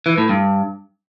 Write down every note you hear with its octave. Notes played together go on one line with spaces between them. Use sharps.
E3
A2
G2